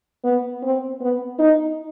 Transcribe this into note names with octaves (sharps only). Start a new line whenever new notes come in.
B3
C4
B3
D#4